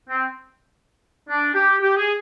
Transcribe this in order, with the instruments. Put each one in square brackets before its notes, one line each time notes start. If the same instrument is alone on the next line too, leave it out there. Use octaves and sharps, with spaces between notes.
[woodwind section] C4
D4
G4
G4
G#4